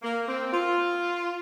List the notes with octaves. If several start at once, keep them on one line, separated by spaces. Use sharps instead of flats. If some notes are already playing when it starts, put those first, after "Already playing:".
A#3
C4
F4